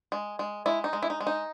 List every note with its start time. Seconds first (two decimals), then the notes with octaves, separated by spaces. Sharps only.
0.12 G#3
0.39 G#3
0.66 G#3 E4
0.84 D#4
0.93 G#3
1.03 E4
1.10 D#4
1.21 G#3
1.27 D#4